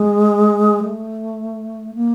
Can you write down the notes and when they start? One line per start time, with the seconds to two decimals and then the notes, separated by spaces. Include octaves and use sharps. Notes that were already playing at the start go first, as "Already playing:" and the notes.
Already playing: G#3
0.84 A3
1.95 A#3